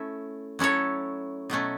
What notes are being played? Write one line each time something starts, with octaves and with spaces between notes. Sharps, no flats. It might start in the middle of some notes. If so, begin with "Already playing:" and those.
Already playing: A3 C#4 E4
F#3 C#4 E4 A4 C#5
B2 F#3 A3 C#4